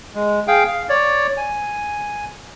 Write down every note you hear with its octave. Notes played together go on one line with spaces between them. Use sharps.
G#3
G#4 F5 G5
F5
C#5 D5
G#5